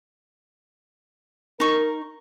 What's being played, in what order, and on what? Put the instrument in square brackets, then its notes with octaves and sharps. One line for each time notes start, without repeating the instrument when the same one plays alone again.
[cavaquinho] D#4 C#6 [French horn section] A#4